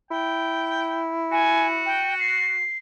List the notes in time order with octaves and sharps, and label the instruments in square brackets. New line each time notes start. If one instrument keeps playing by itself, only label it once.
[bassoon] E4 [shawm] G5
[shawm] F#4 [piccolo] G#5
[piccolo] G5
C7